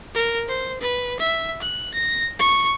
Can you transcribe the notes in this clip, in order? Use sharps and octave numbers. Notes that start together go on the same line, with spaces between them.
A#4
C5
B4
E5
F#6
A#6
C#6